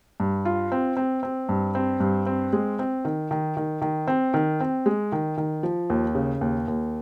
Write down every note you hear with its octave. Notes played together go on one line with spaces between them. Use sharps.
G2
F4
C4
C4
C4
G2
C4
G2
C4
G#3
C4
D#3
D#3
D#3
D#3
C4
D#3
C4
G#3
D#3
D#3
F3
D#2
C#3
D#2
D#2